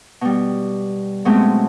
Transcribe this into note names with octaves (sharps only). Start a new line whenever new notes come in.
B2 G3
B2 F#3 G#3 A3 C4 C#4